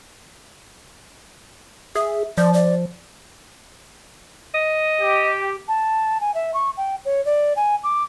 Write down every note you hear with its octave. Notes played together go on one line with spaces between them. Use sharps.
G#4 E5
F3 D5
D5
D#5
G4
A5
G#5
E5
C#6
G5
C#5
D5
G#5
D6